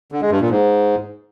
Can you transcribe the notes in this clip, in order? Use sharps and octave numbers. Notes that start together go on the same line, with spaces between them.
D3
G#3
G2
A#2
G#2